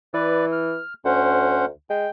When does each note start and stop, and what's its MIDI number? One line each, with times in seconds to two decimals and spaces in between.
0.14 0.78 52
0.14 0.46 71
0.14 0.46 74
0.52 0.94 89
1.05 1.68 38
1.05 1.65 61
1.05 1.65 72
1.05 1.65 78
1.90 2.08 56
1.90 2.10 79